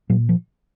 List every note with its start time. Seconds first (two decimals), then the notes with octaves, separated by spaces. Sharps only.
0.10 A#2 F#3
0.29 F3